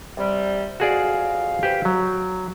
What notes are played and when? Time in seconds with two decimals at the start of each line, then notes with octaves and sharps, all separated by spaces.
0.17 C3 G3
0.80 F2 F#4 G#4 D5 F5
1.63 G4 B4 C5
1.85 F#3